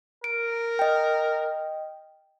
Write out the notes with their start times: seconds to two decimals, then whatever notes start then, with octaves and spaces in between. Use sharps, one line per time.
0.24 A#4 D7
0.79 D#5 G5